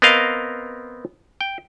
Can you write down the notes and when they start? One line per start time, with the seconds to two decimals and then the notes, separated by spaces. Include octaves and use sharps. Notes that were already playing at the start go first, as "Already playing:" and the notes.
0.02 B3 C4 A#4 D#5 F5
1.41 G5